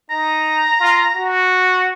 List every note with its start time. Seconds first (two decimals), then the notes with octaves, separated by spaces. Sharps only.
0.10 D#4 A#5
0.80 F4
1.15 F#4